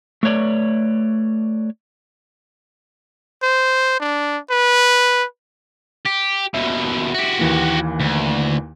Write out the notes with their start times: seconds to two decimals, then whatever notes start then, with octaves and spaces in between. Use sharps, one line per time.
0.23 A3 B4 C#5 D5
3.43 C5
4.00 D4
4.51 B4
6.05 G4
6.54 D#2 B2 E5
7.14 F#4 G4
7.39 D#2 E3 A#3
8.00 D2